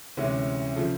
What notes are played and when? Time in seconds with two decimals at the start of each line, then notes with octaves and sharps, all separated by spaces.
0.17 D2 C3 E3 G#3 C#4
0.76 C#3 F3 A3